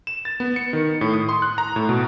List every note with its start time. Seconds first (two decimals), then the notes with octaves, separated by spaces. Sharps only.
0.07 E7
0.25 A6
0.40 B3
0.56 C#7
0.73 D#3
1.01 A2
1.13 D#6
1.29 C6
1.42 F#6
1.58 A#5
1.76 A2
1.89 B2